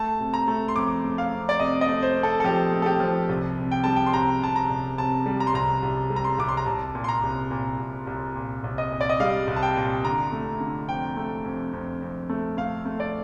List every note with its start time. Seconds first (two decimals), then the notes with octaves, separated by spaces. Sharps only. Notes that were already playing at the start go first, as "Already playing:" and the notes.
Already playing: A3 A5
0.20 C3
0.34 A#5
0.48 A3
0.68 C6
0.76 F2 D6
1.04 A3
1.18 F5
1.32 F2
1.49 D5
1.60 C3 D#5
1.81 D#5
1.89 A3
2.02 C5
2.17 C3
2.23 A4
2.40 A4
2.44 F3 G4
2.72 A3
2.82 A4
2.86 G4
3.00 F3
3.29 C2
3.58 C3
3.71 G5
3.84 G3 A5
3.96 G5
4.06 C6
4.14 C2 A#5
4.42 C3 A5
4.56 A#5
4.69 C2
4.98 C3 A5
5.26 G3
5.40 A#5
5.47 C6
5.54 C2 A#5
5.82 C2
6.10 G3
6.16 A#5
6.24 C6
6.38 C2 D6
6.48 C6
6.57 A#5
6.66 C2 A5
6.95 A#2
7.04 C6
7.09 A#5
7.23 C2
7.51 A#2
7.79 C2
8.07 C2
8.35 A#2
8.64 C2
8.78 D#5
8.92 A#2
9.01 D5
9.09 D#5
9.20 G3 F5
9.47 C2
9.56 A5
9.63 G5
9.76 A#2
10.05 D3 A#5
10.32 A3
10.61 D3
10.88 F2 G5
11.17 A3
11.44 F2
11.73 F2
12.02 F2
12.29 A3
12.57 A3 F5
12.86 A3
13.00 D5